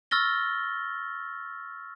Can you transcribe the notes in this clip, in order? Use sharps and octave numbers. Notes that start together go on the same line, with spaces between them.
C#6 E6 F6 A6 A#6 G7